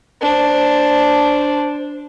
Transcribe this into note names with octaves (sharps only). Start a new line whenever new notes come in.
D4 C5